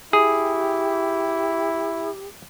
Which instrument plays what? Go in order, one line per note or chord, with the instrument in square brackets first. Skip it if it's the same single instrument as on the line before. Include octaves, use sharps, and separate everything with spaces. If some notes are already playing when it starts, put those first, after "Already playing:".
[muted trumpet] E4 [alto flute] G4 [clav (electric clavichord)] G#4